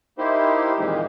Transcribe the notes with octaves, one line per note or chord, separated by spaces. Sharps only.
A#3 D#4 E4 G4 C5
F2 A#2 D#3 E3 G#3 D#4